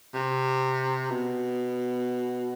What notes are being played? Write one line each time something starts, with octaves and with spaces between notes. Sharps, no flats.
C3
B2